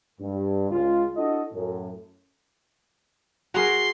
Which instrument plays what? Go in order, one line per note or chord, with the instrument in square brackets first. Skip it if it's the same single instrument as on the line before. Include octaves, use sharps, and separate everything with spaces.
[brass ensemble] G2
C#2 G#3 F4
D4 E4 F#4 A4 D#5
F#2 A2
[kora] F#4 G#4 A#4 [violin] C6